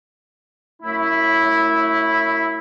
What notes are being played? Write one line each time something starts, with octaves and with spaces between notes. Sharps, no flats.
F#2 A3 E4